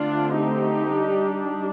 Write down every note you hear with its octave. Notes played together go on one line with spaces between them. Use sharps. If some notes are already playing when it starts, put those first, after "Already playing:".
Already playing: D3 A3 C4 D4 F4
D#4 G4
G3 D4